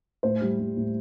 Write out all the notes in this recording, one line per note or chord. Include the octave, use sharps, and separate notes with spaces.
A2 C5
G3
G3
A2